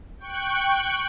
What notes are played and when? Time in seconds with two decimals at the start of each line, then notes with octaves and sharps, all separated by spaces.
0.18 G5 C#6 F#6